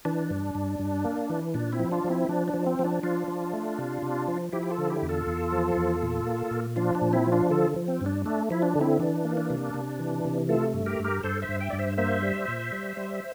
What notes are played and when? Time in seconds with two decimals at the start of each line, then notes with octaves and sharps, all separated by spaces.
0.05 E3 D4
0.30 G2
0.55 G2
0.79 G2
1.04 A#3
1.30 E3
1.54 A#2 D4
1.72 C4 E4
1.79 F3
1.91 D4 F4
2.04 F3
2.10 C4 E4
2.29 F3 D4
2.48 D4
2.54 F3
2.66 C4
2.79 F3
2.84 D4
3.03 F3 D4 F4
3.28 F3
3.53 A3
3.78 C3
4.02 C3
4.28 F3
4.53 F3 E4 G4
4.63 G4
4.71 F4 A4
4.78 D3
4.90 E4 G4
5.02 E2
5.09 F4 A4
5.27 E2
5.52 F3
5.77 E2
6.02 A#2
6.26 A#3
6.51 A#2
6.76 F3 D4 F4
6.95 D4
7.02 A#2
7.13 C4 E4
7.26 F3
7.32 D4 F4
7.50 D3 F4 A4
7.76 F3
7.88 C4
8.01 G2
8.06 D4
8.26 A3 D4
8.51 F3 E4
8.62 D4
8.75 D3
8.81 C4 E4
9.00 E3 D4
9.24 A#3
9.37 D4
9.50 C3
9.74 C3
9.99 E3
10.25 C3
10.49 A3 F4 A4
10.74 G2
10.86 G4 A#4
10.99 G2
11.04 G4 A#4
11.23 G2 A4 C5
11.42 C5 E5
11.49 G2
11.60 E5 G5
11.70 G2 D5
11.79 C5 E5
11.97 A#3 C5 E5
12.22 G3
12.48 A#2
12.72 G3
12.97 G3